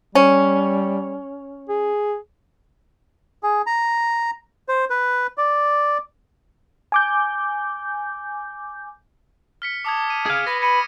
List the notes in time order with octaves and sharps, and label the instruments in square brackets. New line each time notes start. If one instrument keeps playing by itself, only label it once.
[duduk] G3 [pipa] C#4
[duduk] G#4
[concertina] G#4
A#5
C5
B4
D5
[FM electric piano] G#5 D6 G6
[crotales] F6 B6 C#7
[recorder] A5 [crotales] D6 D#6 G#6
[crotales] D#7
[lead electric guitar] G#4 F5
[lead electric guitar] B4 [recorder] B5 [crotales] A#6
[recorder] B5 [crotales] G#6 C#7 D#7